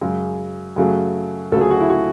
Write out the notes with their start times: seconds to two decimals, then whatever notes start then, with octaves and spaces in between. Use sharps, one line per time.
0.01 F#2 C#3 G#3
0.76 F#2 C#3 F#3 A3
1.52 D2 C#3 F#3 A3 A4
1.61 G#4
1.70 F#4
1.80 E4
1.90 F#4